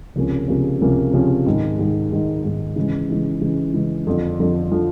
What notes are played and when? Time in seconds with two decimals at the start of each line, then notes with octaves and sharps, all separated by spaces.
0.16 C#2 C3 F3 A#3 C#4
0.48 C#2 C3 F3 A#3 C#4
0.81 C#2 C3 F3 A#3 C#4
1.13 C#2 C3 F3 A#3 C#4
1.46 G#2 D#3 G#3
1.79 G#2 D#3 G#3
2.11 G#2 D#3 G#3
2.44 G#2 D#3 G#3
2.76 C#3 E3 G#3
3.09 C#3 E3 G#3
3.41 C#3 E3 G#3
3.74 C#3 E3 G#3
4.07 F2 D3 F3
4.40 F2 D3 F3
4.71 D3 F3